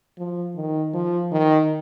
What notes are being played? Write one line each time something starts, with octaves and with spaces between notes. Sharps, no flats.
F3
D#3
F3
D#3